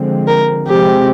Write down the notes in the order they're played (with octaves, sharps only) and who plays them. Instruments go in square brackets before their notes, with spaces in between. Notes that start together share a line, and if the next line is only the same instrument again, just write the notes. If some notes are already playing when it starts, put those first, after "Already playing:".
Already playing: [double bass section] D3 F3 G#3 C4
[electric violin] A#4
[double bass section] C3 F3 G#3 C4 [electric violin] G4